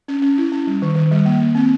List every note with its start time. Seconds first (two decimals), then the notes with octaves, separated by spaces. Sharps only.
0.08 C#4
0.22 C#4
0.38 E4
0.52 C#4
0.67 G3
0.82 D#3
0.96 D#3
1.11 G3
1.26 A#3
1.40 A#3
1.55 C4